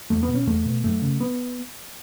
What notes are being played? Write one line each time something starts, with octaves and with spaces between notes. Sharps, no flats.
E2 A3
B3
B2
C#4
E2 A3
B2
F#2 A3
C#3
B3